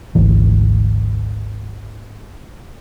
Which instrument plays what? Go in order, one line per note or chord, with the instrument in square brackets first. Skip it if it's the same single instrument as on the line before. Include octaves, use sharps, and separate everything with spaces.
[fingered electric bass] G#1 D2 E3